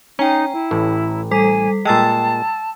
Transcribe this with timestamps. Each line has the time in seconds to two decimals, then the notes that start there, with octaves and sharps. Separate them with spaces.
0.19 C#4 D#4 G5 A#5
0.53 E4
0.71 A1 A2
1.31 G3 A4 G#5 B6
1.85 A#2 G#3 G5 A5 E6 A6